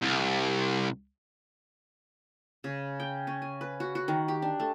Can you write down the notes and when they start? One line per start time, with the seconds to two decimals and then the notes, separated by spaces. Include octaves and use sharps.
0.02 C2
2.64 C#3
3.00 G5
3.27 C#4
3.42 G#5
3.61 B4
3.80 F#4
3.95 F#4
4.08 D#3
4.28 G4
4.42 D4
4.60 A3